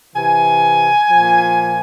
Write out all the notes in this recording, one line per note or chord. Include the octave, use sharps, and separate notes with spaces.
C3 E3 G#5
A#2 F3